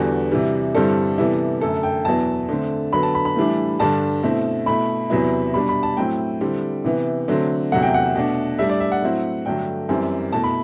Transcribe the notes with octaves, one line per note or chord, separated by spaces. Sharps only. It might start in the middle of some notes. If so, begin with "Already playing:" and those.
Already playing: E2 D3 G3 B3 F#4
C3 E3 G3
G2 D3 G3 C4 E4 A4
C3 E3 G3 B3 E4
F#2 D3 A3 A4
G5
E2 B2 F#3 B3 E4 A5
D3 A3 C4
D3 F#3 B3 B5
A5
B5
B5
A2 E3 G3 D4
G2 D3 G3 D4 A5
B2 A3 C4 E4
B2 A3 E4 B5
E2 C3 F#3 B3 E4
B2 G3 D4 B5
B5
A5
A2 F#3 C4 E4 G5
D3 G3 C4 E4
C3 E3 B3
D3 F#3 A3 C4
E2 C3 F#3 A3 F#5
G5
F#5
B2 A3 D4
A2 G3 D4 E5
D5
E5
F#5
A2 F#3 C4 E4
G2 D3 F#3 A3 G5
F#2 E3 G3 C4
B2 A3 E4 A5
B5